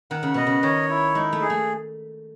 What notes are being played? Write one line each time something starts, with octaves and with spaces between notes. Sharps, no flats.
D#3 F#5
C#3
B2 D#5
C#3
D#3 C#5
E4
G#3 D#4
A3
G#4
A3